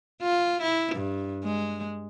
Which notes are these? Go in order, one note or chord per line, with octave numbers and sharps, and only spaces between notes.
F4
E4
G2
G#3